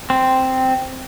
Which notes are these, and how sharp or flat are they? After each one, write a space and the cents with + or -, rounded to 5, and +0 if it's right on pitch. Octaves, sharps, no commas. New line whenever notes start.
C4 -5